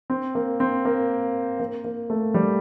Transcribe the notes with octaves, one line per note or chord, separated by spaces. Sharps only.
C4
A#3
C4
A#3
A#3
A#3
A3
G3